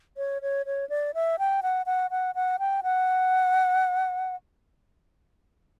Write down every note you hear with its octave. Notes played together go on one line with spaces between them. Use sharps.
C#5
C#5
C#5
D5
E5
G5
F#5
F#5
F#5
F#5
G5
F#5